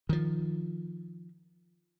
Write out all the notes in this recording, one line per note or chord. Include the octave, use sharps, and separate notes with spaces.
D#3 F3